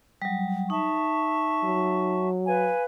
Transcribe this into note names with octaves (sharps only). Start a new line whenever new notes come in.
F#3 G3
D#4 E5 A5 C#6
F#3
B4 F5 G#5